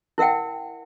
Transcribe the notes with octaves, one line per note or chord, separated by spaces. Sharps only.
E4 A#4 E5 F#5 G5